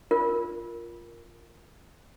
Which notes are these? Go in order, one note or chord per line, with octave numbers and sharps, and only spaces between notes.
F4 A#4